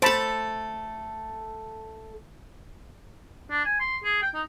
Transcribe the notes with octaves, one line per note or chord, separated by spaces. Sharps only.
A3 A4 C5 A5 B5
D4
G#5
C6
G#4
G5
D#4